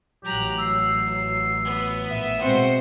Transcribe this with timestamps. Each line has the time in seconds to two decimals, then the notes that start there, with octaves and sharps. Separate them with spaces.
0.25 A1 F#3 G4 A#5 F#6
0.59 E6 C7
1.65 B3
2.10 A#1 A2 E5
2.41 B2 G#3 C4 F#4 C5 C7